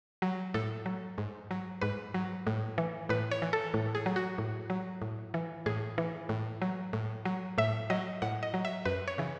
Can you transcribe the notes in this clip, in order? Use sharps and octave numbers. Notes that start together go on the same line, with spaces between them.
F#3
A2 A4
F#3
G#2
F#3
G#2 B4
F#3
A2
E3
A2 B4
C#5
E3
A4
A2
G#4
F#3
F#4
A2
F#3
A2
E3
A2 G#4
E3
A2
F#3
A2
F#3
A2 E5
F#3 D#5
A2 F#5
D#5
F#3
E5
F#2 B4
C#5
C#3 E3